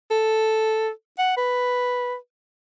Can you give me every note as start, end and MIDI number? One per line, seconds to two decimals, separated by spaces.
0.11 0.90 69
1.18 1.34 78
1.37 2.16 71